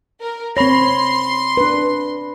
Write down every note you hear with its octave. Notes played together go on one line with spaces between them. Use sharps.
A#4
C4 C#5 B5 C6 A#6
D4 B4